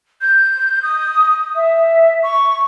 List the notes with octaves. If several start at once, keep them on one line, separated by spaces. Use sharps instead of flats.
G6
D#6
E5
C#6